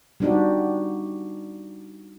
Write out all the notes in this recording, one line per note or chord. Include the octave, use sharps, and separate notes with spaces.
G3 B3 D4 D#4 F#4 G4